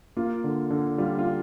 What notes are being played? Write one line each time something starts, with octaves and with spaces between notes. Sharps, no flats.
A#3 F4
D3
D3
G3 F4
F4